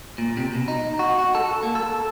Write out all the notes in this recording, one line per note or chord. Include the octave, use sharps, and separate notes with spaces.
A#2
C3
B2
D#4
F#4
F#4
A4
A#3
A4